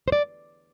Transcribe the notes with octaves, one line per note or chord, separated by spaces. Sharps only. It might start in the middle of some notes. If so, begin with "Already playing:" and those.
C5
D5